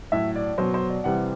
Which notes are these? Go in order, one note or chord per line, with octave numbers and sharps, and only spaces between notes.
A2 F#3 E5
D5
B2 F#3 C5
C5
D5
C3 E3 G3 F#5